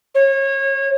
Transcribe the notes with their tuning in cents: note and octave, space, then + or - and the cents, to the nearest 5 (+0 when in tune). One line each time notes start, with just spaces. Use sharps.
C#5 -30